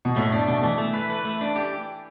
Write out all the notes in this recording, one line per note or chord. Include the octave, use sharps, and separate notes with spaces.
B2
A2 A3
D4
B2 A3
E3 A3
A3
B4
B4
A3
D4
G4